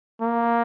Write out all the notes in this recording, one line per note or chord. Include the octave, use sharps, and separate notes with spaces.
A#3